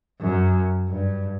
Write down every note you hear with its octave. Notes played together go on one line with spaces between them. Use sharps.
F#2
G2